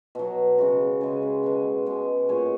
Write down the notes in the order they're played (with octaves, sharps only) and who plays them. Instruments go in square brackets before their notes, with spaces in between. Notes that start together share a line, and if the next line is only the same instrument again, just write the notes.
[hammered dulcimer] B2 F#3
C#3 G#3 F#4
C#3 G#3 G#4
B4
B2 G#3
B2 G#3
A#2 G#3 C#5